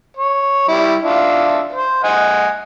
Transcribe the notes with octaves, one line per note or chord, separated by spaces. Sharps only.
C#5
G3 E4
D4 F4 E5
C5
D#5 F#5 G#5